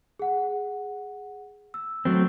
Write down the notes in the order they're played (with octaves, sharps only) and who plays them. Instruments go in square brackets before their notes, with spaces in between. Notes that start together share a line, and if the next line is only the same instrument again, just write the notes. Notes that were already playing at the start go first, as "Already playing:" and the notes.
[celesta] G#4 F#5
E6
[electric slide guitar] F#3 A3 C4